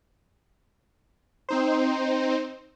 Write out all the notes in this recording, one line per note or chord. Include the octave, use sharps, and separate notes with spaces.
C4 D#4 C5